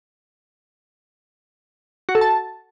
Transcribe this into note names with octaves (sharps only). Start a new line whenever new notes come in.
F#4
A4
A5